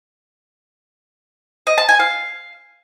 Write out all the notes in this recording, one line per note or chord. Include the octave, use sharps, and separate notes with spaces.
D#5
A5
G#5
F5